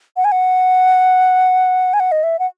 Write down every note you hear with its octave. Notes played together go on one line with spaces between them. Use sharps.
F#5
G#5
F#5
G#5
F#5
D#5
E5
F#5